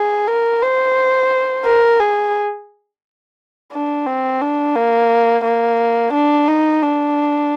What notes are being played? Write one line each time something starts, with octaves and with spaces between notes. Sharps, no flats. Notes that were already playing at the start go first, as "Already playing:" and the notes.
Already playing: G#4
A#4
C5
A#4
G#4
D4
C4
D4
A#3
A#3
D4
D#4
D4